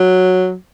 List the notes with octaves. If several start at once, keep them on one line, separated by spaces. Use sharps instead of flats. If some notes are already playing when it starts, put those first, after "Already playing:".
Already playing: F#3